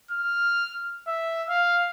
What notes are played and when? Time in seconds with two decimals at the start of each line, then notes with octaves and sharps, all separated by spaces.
0.11 F6
1.08 E5
1.49 F5